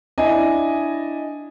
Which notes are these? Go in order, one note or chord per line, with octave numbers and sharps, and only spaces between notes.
D4 E4 D#5 G#5